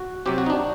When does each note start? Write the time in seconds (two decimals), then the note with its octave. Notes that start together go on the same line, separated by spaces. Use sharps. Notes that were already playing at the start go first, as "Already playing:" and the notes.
Already playing: F#4
0.26 C3 F#3 C4 G4
0.38 F#4
0.46 D#4
0.50 D4